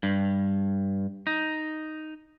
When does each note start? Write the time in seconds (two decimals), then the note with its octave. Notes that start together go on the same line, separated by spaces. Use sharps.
0.03 G2
1.27 D#4